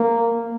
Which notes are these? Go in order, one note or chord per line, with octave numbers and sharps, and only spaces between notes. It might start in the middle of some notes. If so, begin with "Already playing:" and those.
Already playing: A#3